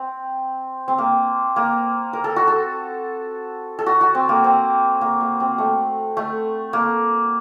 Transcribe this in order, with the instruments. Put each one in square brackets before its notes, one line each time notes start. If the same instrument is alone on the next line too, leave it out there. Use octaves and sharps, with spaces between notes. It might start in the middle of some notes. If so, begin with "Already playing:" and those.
Already playing: [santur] C4
C4
A#3
A#3
A#4
A4
F#4
A4
A4
F#4
F#4
C4
A#3
C4
A#3
A#3
C4
A3
A3
A#3